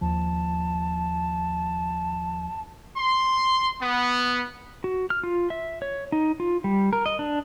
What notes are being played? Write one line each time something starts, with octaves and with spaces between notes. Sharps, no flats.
D#2 F3 A5
C6
B3
F#4
F6
F4
E5
C#5
D#4
F4
G3
A#4
D#5
D4